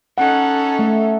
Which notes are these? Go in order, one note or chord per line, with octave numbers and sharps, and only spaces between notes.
C#4 D#4 A4 F#5
A3